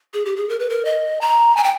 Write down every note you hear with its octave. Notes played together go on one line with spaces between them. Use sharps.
G#4
G4
G#4
A#4
B4
A#4
D#5
A#5
G#5
G5